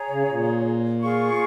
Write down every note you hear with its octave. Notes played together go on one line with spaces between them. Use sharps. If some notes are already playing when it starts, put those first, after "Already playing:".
Already playing: G#4 C#5 A#5
C#3
A#2
F4 G#4 F5 C#6